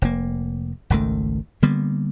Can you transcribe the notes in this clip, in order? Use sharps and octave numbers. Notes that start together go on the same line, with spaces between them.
F1 A#2 A#3
G#1 C#2 D#3 A3
D3 G3 A#3 B3